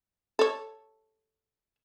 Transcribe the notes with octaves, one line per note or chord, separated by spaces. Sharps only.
A4 C#5